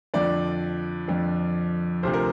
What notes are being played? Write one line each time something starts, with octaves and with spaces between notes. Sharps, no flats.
F2 D3 F3 D5
F2 D3 F3
D2 C3 F3 C5
A#4